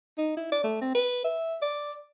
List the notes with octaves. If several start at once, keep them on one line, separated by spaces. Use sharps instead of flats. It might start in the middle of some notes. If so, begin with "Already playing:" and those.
D#4
E4
D5
A3
C4
B4
E5
D5